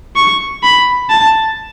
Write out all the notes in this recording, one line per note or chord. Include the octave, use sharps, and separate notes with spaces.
C#6
B5
A5